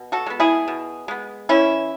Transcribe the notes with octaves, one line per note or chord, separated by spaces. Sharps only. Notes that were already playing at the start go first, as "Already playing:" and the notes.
Already playing: B2
F#4 A4
G#3 B3
E4 G#4
B2
G#3 B3
E3 C#4 E4